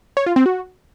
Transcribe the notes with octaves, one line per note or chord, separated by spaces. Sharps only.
C#5
F4
C4
F#4